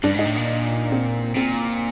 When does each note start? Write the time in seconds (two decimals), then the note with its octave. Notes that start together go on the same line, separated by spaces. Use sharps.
0.04 G2 D4
0.15 G#2 D#4
0.26 A2
0.37 A#2
0.92 C4
1.36 A#2 C4